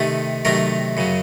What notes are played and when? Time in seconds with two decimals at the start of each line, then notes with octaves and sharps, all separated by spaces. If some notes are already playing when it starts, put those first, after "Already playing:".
Already playing: C3 D#3 A3
0.45 C3 D#3 F#3 A3 A#4
0.97 F#2 C#3 F#3